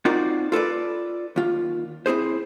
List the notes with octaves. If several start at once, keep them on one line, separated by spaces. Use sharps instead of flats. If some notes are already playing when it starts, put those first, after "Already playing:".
C4 D#4 F4 F#4 A#4 D5
F4 A4 B4 D5
D#2 F4
C4 E4 G#4 C5